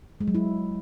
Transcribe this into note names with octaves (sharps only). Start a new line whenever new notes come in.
G#3
F#3
E4